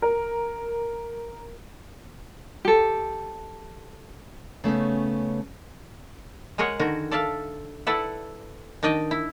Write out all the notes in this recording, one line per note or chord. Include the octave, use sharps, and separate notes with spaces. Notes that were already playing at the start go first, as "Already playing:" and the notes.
A#4
G4 A4
C#3 A3 B3 C#4
G#3 G#4 A#4 C#5 F#5
D3 D#3 F#4 A#4
A4 D5 E5 F5 A5
E4 A4 B4 D5 E5 F#5
D#3 D4 D5 D#5 G5
E4